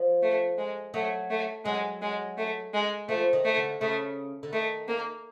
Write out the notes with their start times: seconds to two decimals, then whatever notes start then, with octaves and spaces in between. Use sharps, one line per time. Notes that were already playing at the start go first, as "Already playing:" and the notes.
Already playing: F3
0.22 A3
0.58 G#3
0.94 F#3 A3
1.30 A3
1.65 F#3 G#3
2.02 G#3
2.37 A3
2.74 G#3
3.09 F3 A3
3.33 D#3
3.45 A3
3.57 D3
3.81 C#3 A3
4.43 D3
4.53 D#3 A3
4.88 A#3